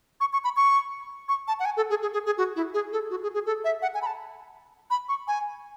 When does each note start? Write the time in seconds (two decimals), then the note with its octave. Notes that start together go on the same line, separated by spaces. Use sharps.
0.21 C#6
0.33 C#6
0.44 B5
0.57 C#6
1.29 C#6
1.48 A5
1.59 F#5
1.65 G#5
1.77 A4
1.90 G#4
2.02 G#4
2.13 G#4
2.26 G#4
2.38 F#4
2.56 E4
2.74 G#4
2.92 A4
3.11 F#4
3.23 G#4
3.34 G#4
3.46 A4
3.64 E5
3.82 F#5
3.94 G#5
4.02 B5
4.06 A5
4.90 B5
5.09 C#6
5.28 G#5